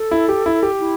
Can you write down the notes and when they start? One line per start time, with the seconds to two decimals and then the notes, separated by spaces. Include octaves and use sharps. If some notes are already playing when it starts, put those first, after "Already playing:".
Already playing: A4
0.11 E4
0.29 G4
0.46 E4
0.63 G4
0.80 E4